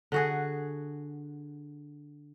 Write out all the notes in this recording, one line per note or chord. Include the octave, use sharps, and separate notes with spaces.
D3 F#4 G#4